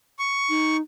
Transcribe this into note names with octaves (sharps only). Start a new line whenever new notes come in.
C#6
D#4